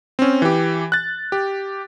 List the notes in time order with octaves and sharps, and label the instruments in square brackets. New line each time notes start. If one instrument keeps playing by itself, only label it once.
[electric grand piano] C4 C#4
E3 G4
F#6 A6
G4